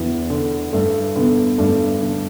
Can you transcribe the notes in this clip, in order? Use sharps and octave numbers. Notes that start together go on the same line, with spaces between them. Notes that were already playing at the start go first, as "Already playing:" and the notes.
Already playing: E2 D3 B3
D3
G2 A3
D3 B3
G2 A3 D4
D3